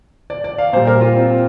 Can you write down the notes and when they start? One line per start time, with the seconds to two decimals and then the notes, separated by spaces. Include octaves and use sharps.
0.30 D5
0.44 D5
0.58 F5
0.73 A#2 G3 C5
0.87 A#4
1.01 F4
1.16 C4